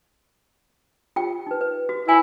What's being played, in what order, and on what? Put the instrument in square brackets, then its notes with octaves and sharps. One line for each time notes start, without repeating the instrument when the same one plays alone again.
[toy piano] F4 G4 G5
D#4 B4
B4
F#4
[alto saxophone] E4 [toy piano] E5 G#5